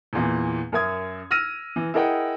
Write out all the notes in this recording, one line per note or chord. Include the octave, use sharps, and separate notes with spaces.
E2 A#2 E3
F#2 A#4 E5 D#6 G#6
E6 F6 A#6 D#7
E3
E4 G#4 A#4 D#5 F#5 G5